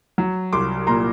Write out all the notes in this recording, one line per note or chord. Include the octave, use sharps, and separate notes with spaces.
F#3
C2 C6 D6
A#2 A#5 C6